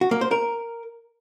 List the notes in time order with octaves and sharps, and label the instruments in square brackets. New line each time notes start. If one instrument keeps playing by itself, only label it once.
[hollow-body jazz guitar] F#4
A#3
C5
A#4